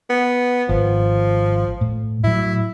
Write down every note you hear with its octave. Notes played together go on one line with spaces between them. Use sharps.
B3
G#1 F3
A2
A2 F#3 E4